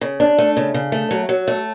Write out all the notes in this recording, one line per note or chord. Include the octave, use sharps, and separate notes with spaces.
C#3
D4
A3
C#3
C#3
A3
F#3
F#3
A3